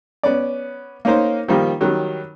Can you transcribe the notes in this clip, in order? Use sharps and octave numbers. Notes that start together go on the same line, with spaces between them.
B3 C#4 D5
A#3 C#4 D#4 A#4 C5
D#3 F3 G3 A#3 D#4
D#3 F#3 G3